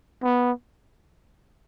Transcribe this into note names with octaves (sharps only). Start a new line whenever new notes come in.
B3